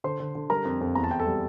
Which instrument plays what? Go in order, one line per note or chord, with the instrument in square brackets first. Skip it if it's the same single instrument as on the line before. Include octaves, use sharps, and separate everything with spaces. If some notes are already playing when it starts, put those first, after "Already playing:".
[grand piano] D3 C5 C6
D3
D3
G3 A#4 A#5
F2
F2
E2 A#5
A5
E3 G5
A4 A5
G3